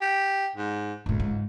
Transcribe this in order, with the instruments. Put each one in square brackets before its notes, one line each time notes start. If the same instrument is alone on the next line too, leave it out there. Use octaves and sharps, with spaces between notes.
[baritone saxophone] G4
G#2
[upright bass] G1 A2 [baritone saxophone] C#2
[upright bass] G#2